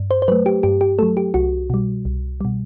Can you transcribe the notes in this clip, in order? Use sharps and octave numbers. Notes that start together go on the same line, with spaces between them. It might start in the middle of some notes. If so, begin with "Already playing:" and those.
Already playing: G2
C5
C5
F#3 A3 B4
G4
G2 G4
G4
F#3 A3 A4
G4
C2 F#4
B2 G3
C2
B2 G3